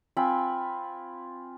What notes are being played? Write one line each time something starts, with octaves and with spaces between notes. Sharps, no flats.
C4 F4 G#5 B5